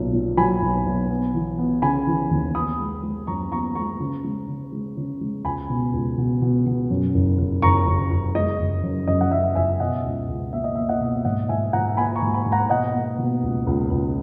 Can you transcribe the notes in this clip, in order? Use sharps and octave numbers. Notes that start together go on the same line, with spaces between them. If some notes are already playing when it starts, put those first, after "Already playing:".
Already playing: B1 A#2
A#2
F#3 G#5 B5
B1
B1
B3
E3
B3
C#3 G#5 B5
E3
D#2
B3 B5 D#6
G#3
G#3
F#2 A#5 C#6
B3 A#5 C#6
G#3 A#5 C#6
C#3
G#3
C#3
G#3
C#3
G#3
C#2 G#5 B5
B2
C#2
B2
B2
B2
F#2
F#1
F#1
F#1 A#5 C#6
F#1
F#1
G#3 D#5
F#1
F#2
F#2 D#5
F#5
F#2 E5
F#1 E5 G#5
B2 D#5 F#5
C#2
C#2
A#3 E5
D#5
A#3 E5
D#5 F#5
B2
G#2 D#5 F#5
G#2 E5 G#5
G#2 F#5 A#5
A#3 G#5 B5
A#5 C#6
G#2
G#5 B5
G#2
F#5 A#5
B2 D#5 F#5
A#3
B2
C#2
C#2
C#2